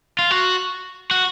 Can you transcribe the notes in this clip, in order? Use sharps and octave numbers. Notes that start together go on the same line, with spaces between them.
F4
F#4
F#4